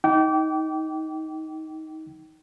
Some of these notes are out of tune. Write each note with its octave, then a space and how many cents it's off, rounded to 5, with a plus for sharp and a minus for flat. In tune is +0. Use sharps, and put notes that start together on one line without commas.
D#4 +20 G5 -25 D6 -25